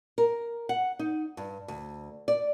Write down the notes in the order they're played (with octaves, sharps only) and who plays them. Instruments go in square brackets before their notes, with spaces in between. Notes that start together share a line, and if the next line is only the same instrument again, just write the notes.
[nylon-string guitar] A#4
F#5
D#4
G2
D2
D5